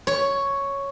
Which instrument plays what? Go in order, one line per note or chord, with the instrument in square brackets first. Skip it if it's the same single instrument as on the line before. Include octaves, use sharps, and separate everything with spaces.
[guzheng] C#5